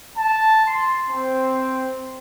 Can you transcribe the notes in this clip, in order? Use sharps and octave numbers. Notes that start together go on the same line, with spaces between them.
A5
C6
C4